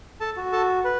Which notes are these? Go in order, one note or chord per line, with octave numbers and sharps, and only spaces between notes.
A4 A5
F#4
A4 A5
B4